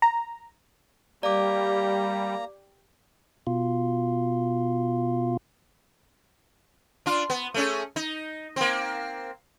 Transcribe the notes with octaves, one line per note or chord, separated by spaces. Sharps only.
A#5
G3 A#3 G4 D5 A#5 D6
B2 F4
D4 F4
B3
A3 C#4 G#4
D#4
A#3 C4